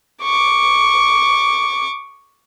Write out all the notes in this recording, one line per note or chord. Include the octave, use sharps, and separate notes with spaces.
C#6 D6